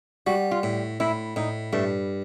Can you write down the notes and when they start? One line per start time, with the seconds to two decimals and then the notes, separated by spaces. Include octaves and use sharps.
0.26 G3 F#4
0.51 F4
0.63 A2
1.00 A2 E4
1.36 A2 D#4
1.73 G2 A3